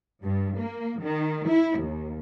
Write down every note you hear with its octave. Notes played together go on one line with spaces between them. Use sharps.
G2
A#3
D#3
E4
D#2